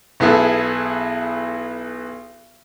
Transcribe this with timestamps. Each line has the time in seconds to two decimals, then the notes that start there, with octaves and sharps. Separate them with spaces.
0.20 B1 B3 E4 G#4 A4